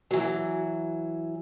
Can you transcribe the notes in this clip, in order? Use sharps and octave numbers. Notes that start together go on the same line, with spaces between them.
E3 F#3